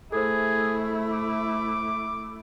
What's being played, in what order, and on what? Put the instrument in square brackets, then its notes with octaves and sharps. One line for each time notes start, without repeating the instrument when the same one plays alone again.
[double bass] A3 E4 [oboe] G#4 [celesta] A4 C5
[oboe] D6